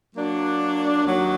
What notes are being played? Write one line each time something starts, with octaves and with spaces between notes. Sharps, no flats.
F#3 A#3 D4
D#2 D#3 F#3